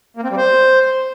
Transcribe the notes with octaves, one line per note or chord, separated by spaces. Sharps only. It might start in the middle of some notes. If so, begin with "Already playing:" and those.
A#3
C4
G3
C5